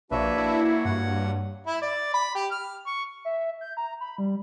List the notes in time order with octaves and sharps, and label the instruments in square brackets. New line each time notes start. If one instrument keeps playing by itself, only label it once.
[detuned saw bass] A#1 [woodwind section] A#3 F#4 C#5 [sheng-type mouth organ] D4 B4 E5
[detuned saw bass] E4
[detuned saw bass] G2 [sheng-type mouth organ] F#5
[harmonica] E4
D5
B5
G4
F6
C#6
[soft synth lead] E5
G6
A#5
B5
G3